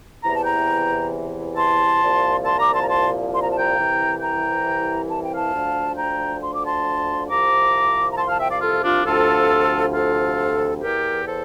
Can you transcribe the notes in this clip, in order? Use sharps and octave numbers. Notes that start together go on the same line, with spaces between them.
E2 C3 E3 A#5
A5
G5 A#5
A5 C6
C2 A#2 F3
A5 C6
A#5 D6
A5 C6
A#5
A5 C6
C6
A#5
A5
G5 A#5
C2 C3 E3
G5 A#5
A5
G5
F5 A5
D2 D3 F3
G5 A#5
C6
D6
A5 C6
C2 C3 F3 A#5 D6
A#5
A5 C6
F5 A5
E5 G5
D5 F5
F4 A4
D4 F4
D2 C3 F3 F4 A4
F4 A4
E2 E3 G4 A#4
A4 C5